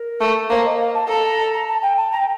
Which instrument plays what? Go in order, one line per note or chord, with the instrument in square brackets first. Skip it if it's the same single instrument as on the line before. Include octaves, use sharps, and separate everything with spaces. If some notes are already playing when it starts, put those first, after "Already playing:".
Already playing: [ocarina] A#4
[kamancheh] A3
[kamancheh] A#3 [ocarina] C5
[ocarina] D#5
F5
A5
[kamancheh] A4 [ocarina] A#5
[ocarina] A#5
A5
G5
A5
A#5
G5